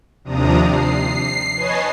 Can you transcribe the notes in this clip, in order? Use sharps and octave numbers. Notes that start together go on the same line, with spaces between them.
D#2 C3 F3 D4 A#5 D#6
C7
B4 C#5 D#5 G#5 A5